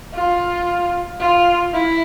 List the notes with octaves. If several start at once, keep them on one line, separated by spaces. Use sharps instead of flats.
F4
F4
E4